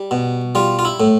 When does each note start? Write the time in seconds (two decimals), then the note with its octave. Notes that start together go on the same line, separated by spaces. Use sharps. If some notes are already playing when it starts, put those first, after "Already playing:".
Already playing: G3
0.11 B2
0.55 G3 F4
0.79 F4
0.85 E4
1.00 A2